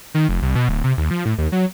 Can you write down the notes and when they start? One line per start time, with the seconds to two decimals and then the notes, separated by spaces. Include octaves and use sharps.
0.14 D#3
0.29 F1
0.42 C2
0.55 B2
0.69 D1
0.84 C3
0.98 D#2
1.11 F3
1.25 A2
1.38 D#2
1.52 F#3